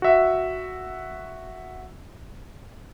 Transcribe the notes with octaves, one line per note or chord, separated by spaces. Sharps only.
F#4 E5